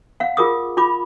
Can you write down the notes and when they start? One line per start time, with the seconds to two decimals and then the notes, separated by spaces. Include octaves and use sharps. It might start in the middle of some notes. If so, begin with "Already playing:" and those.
0.20 F5 F#5
0.37 F4 G#4 A#4 D6 D#6
0.77 F4 B5 D6